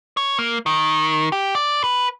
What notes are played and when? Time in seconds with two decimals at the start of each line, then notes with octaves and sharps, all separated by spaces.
0.17 C#5
0.39 A#3
0.66 D#3
1.32 G4
1.55 D5
1.84 B4